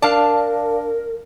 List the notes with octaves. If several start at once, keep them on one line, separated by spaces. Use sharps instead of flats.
D4 A#4 D5 F5 A5